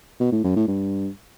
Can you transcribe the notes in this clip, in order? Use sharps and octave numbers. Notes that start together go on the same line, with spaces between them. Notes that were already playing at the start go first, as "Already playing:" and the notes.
B2
A2
F#2
A2
G2